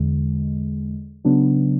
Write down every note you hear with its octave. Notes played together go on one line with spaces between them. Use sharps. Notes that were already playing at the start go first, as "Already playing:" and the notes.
Already playing: E2 D3 G#3
C#3 F#3 B3 D4